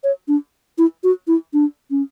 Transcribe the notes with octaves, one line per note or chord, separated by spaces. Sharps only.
C#5
D4
E4
F#4
E4
D4
C#4